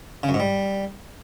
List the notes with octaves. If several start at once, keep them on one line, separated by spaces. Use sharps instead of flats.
C#3
F#2
G#2
G3